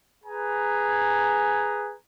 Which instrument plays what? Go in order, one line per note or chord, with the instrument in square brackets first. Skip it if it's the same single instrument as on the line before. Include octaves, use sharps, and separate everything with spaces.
[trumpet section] G#4 B4 G#5 A#5